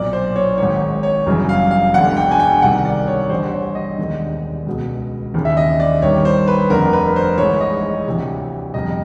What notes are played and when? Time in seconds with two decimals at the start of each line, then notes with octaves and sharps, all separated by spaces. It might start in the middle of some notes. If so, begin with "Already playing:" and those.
Already playing: B1 A#2 D5
0.13 C5
0.36 C#5
0.58 G#1 G#2 D#3 C#5
1.03 C#5
1.26 G1 F#2 C#3 E3
1.49 F5
1.71 F5
1.94 E1 D2 D3 F#5
2.17 G5
2.31 G#5
2.40 G5
2.62 C2 C3 D#3 F#5
2.85 D5
3.08 C#5
3.30 A1 G2 D3 C5
3.53 C#5
3.75 D#5
3.98 E1 D#2 D3
4.67 C#2 B2
5.34 D#2 C#3 E3
5.45 E5
5.57 D#5
5.80 D5
6.02 G1 G2 D#3 C#5
6.25 C5
6.48 B4
6.70 F1 F2 D3 A#4
6.93 B4
7.16 C5
7.38 A#1 G#2 E3 C#5
7.61 D#5
8.06 D2 C3 E3
8.74 G1 F2 C3 D#5